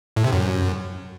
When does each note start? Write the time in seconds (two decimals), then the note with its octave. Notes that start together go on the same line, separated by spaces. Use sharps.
0.16 A2
0.25 C3
0.33 F#2